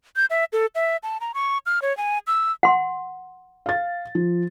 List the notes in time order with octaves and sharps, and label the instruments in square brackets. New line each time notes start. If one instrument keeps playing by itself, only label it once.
[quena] G6
E5
A4
E5
A5
A#5
C#6
F6
C#5
G#5
E6
[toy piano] F#5 C6
[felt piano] F5 A6
F3